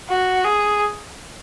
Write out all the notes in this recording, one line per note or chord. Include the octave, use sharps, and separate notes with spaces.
F#4
G#4